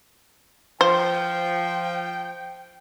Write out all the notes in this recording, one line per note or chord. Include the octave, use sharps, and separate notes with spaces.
F3 C5 G5